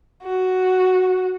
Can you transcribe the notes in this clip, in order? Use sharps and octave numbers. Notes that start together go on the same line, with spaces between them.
F#4